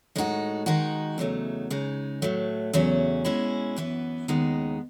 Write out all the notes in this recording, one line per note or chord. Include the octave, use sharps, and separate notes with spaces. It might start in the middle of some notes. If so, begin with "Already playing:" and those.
A2 G#3 D#4 F#4
D#3 G#3 D#4 F#4
E2 C#3 F#3 A3 D#4
C#3 G#3 D#4
A2 F#3 A3
E2 C#3 F#3 A3 C#4
B2 G#3 C#4 E4
F#2 E3 B3
D#2 C#3 G#3 B3 D#4